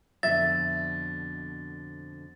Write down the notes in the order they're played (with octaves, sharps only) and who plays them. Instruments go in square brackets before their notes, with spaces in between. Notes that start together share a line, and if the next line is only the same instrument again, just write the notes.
[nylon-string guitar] F2 B2 D3 [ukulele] E5 [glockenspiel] A6